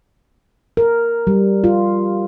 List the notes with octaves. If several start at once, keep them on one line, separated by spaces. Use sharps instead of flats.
A#4
G3
F4